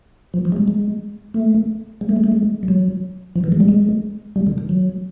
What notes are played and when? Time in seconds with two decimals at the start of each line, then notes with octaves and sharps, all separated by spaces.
0.34 F3
0.45 F3
0.52 G#3
0.56 G3
0.68 G#3
1.34 A3
2.01 G#3
2.09 A3
2.16 G#3
2.24 A3
2.32 G#3
2.63 G3
2.68 F#3
3.36 F3
3.44 E3
3.52 G#3
3.60 G3
3.68 G#3
4.36 G3
4.47 D3
4.58 D#3
4.69 F#3